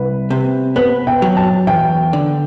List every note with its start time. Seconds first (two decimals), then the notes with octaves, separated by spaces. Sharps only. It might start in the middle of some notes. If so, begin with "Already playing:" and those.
Already playing: C2 B4
0.30 C3
0.76 B3 B4
1.07 G5
1.22 F#3
1.37 A5
1.67 E2 G5
2.13 D3